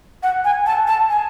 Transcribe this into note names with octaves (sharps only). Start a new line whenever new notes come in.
F#5
G#5
A5
A5
G#5